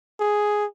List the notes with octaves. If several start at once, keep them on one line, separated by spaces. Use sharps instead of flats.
G#4